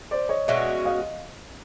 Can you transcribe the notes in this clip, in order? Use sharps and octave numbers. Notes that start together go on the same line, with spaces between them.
C5 D5
C#5 D#5
B2 G#3 C#4 F#4 D5 E5
D#5 F5